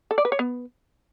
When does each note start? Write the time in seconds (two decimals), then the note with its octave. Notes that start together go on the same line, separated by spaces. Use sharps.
0.11 A4
0.18 D5
0.25 B4
0.32 C#5
0.39 B3